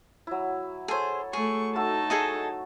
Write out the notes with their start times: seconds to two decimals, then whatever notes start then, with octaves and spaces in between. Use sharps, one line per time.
0.27 F#3 E4
0.88 G#4 A4 C5 C#5
1.33 A3 G#4 C#6
1.75 A3 D#4 F#4 A5 E6
2.10 G#4 A4 D#5